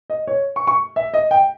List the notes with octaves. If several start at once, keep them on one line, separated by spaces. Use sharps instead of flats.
D#5
C#5
C#6
C#6
E5
D#5
G5